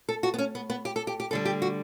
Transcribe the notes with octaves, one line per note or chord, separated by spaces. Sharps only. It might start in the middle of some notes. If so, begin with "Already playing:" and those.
A4
F#4
B3
C#4
B3
B3
G4
A4
G4
G4
D2 D3 G3 A4
G4
F#4